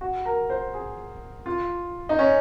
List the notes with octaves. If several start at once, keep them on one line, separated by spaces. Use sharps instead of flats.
F#4
A#4
C5
G#4
F4
D#4
C#4